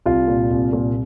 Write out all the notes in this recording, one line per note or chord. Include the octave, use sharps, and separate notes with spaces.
C2 F4
A#2
C2
A#2